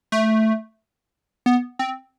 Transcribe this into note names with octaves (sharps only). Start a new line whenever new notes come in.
A3
B3
C4